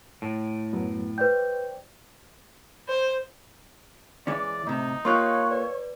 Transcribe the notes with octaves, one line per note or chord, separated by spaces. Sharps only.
A2
F#2 F#3 B3
B4 C5 D5 G5 G6
C5
E3 G#3 C#4 D5
A2 C3 D#4
A#3 F4 G4 C#5 C6 C#6 F#6
B4 D5